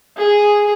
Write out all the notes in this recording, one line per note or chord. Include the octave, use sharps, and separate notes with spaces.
G#4